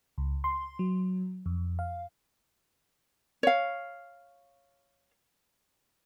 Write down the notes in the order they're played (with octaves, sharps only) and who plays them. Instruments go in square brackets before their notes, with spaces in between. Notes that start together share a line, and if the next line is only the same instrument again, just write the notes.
[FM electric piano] C#2
C6
F#3
F2
F5
[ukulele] C#5 F5